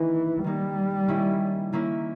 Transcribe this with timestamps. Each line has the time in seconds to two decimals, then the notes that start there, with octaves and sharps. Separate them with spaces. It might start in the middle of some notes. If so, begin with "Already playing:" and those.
Already playing: D#3 E3 A#3 D#4
0.44 D#3 G3 A#3 D#4
1.08 D#3 A#3 C#4 E4
1.72 D#3 A#3 C#4 E4